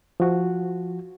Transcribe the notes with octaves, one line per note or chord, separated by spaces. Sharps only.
F3 F#4